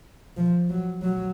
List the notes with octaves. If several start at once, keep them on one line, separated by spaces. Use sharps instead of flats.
F3
F#3
F#3